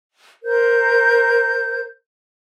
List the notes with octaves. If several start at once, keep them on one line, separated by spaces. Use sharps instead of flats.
A#4 C5 G6